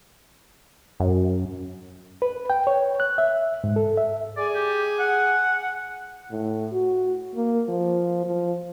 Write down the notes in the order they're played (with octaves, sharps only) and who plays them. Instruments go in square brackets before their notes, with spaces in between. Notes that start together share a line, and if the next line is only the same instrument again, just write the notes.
[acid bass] F#2
[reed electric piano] B4
G5
C#5
F#6
E5
G#2
A4
E5
[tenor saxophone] G#4 [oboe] D5
[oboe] G4
F#5
[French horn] A2
F#4
A#3
F3
F3